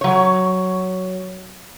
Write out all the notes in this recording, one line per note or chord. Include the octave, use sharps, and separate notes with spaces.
F#3 C#5